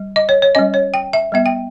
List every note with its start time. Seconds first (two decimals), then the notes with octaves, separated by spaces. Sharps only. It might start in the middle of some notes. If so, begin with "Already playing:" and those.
Already playing: G3
0.16 D#5
0.29 C#5
0.42 C#5
0.55 G3 C#4 D#5
0.74 C#5
0.94 G5
1.13 E5
1.32 G3 B3 E5
1.46 G5